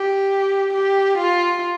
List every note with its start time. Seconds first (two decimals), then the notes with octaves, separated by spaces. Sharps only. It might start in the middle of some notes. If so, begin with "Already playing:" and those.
Already playing: G4
0.74 G4
1.18 F4